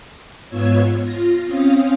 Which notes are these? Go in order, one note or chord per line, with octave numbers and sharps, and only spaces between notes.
G#2 B3 F4 C#5 E6 G#6
F4 A#6
C4 C#4 F5 D#6